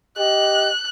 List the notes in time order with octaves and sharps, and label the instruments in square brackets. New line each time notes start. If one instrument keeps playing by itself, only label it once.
[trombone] G4 [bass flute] D#5 [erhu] F#6